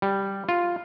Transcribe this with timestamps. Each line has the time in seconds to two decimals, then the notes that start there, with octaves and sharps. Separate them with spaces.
0.02 G3
0.49 F4